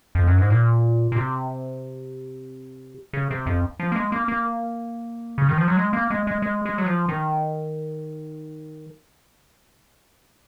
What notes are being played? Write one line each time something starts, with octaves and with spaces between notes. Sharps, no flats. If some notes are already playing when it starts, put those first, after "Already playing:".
F2
F#2
G#2
A#2
A#2
C3
C#3
C3
F2
F3
A#3
G#3
A#3
A#3
C#3
D#3
F3
F#3
G#3
A#3
G#3
G#3
G#3
G#3
F#3
F3
D#3